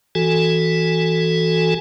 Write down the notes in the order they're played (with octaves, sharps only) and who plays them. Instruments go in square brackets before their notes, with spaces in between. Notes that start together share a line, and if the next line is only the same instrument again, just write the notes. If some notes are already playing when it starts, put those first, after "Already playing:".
[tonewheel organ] E3 F#4 A4 G#5